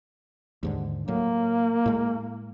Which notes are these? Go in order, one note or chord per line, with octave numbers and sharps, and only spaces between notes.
D#2 G#2 D3
A2 F#3 A#3
A2 G#3